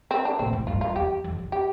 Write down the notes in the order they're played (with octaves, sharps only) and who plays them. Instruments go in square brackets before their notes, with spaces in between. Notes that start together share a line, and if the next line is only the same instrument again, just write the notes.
[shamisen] C4
D4
[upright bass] A#2 [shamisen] C4
[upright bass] A2
[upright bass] G2 [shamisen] F4
[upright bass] F2 [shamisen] F4
[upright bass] E2 [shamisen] G4
[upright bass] F2
F2
[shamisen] G4